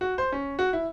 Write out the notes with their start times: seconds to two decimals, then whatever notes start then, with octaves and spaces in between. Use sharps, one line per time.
0.01 F#4
0.18 C5
0.32 C#4
0.59 F#4
0.73 E4